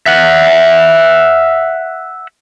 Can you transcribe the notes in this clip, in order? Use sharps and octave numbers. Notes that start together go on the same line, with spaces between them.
E5 F#5